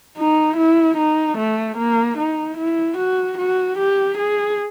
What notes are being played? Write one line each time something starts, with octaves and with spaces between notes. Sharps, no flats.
D#4
E4
D#4
A3
A#3
D#4
E4
F#4
F#4
G4
G#4